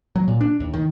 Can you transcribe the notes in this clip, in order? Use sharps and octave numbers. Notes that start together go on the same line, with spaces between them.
F#3
A#2
D4
D#2
D#3